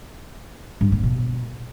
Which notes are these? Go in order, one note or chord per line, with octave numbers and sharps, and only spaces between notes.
G2
A#3
B2